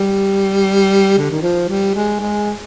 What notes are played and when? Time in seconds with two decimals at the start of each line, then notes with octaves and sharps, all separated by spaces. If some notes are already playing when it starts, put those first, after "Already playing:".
Already playing: G3
1.18 D3
1.30 D#3
1.42 F3
1.68 G3
1.95 G#3
2.20 G#3